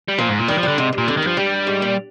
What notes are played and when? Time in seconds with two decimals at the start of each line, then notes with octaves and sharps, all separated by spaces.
0.08 G3
0.18 A#2 F3
0.29 G#2
0.38 A#2
0.48 D#3 G3
0.58 F3
0.63 D3 G3
0.78 G#2 C3
0.93 G2
0.98 A#2
1.08 F2 D3
1.17 D#3
1.22 G2 F3
1.37 G2 G3
1.67 G#2
1.82 A#2